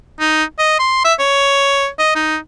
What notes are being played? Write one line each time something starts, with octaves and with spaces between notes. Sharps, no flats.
D#4
D#5
C6
E5
C#5
D#5
D#4